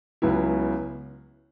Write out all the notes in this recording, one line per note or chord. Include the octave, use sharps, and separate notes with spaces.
C#2 C#3 F#3 B3 E4